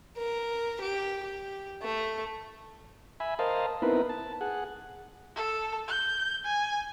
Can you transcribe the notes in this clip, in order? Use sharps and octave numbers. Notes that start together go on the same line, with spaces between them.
A#4
G4
G4
A3
E5 G#5 B5
A#4 C5 D#5 F5 A5
B3 C4 D#4 E4 A#4 B4
A5
G#4 F#5
A4
G6
G#5